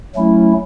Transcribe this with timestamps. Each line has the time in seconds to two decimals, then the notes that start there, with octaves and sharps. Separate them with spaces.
0.15 F#3 A3 C#4 E4